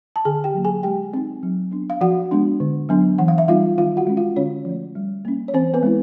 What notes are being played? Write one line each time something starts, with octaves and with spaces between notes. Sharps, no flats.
A5
D3 G#4 G#5
G4 G5
F#3 A#3
G#4 G#5
G#3 G4 G5
C4 D#4
F#3
B3 D4
F5
F3 F#4 F#5
G#3 B3 D4
D3
F#3 B3 D4
E3 F#5
F5
E5
G3 C4 D#4 F4 F5
D#3 F4 F5
F#4 F#5
G#3 C#4
F4 F5
D3 C#4 C#5
F3 A3
G3
A#3 C#4
C#5
E3 C4 C5
B3 B4
G#3 C4 E4